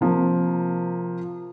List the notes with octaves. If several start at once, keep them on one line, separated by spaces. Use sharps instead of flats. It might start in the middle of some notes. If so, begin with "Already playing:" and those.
C3 F3 A#3